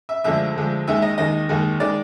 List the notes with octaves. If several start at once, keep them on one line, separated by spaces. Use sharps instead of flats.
E5
D2 D3 F3 G#3 E5
D2 D3 F3 G#3
D#2 D#3 G#3 E5
D#5
D#2 D#3 G#3 D#5
D#2 D#3 G#3
D#3 G#3 D5